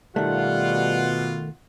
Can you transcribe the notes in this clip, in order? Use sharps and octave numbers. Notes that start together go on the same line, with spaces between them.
B2 D#3 G3 A3 F4 F#5